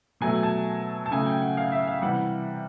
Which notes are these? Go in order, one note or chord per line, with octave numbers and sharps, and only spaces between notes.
B2 F#3 A3 G#5
A5
A5
C#3 F#3 A3 G#5
G5
F#5
F5
E5
F5
C3 E3 G3 F#5